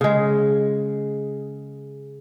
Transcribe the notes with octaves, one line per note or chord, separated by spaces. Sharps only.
C#3 G#3